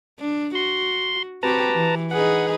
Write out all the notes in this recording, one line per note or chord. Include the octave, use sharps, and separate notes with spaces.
D4
F#4 C6
C4 F#4 G4 B4 A5 A#5
E3
D#4 G#4 B4 F#5